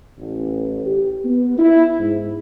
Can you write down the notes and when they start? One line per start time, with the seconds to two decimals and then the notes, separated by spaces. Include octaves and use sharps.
0.18 A1
0.86 G4
1.25 B3
1.59 E4
2.00 G#2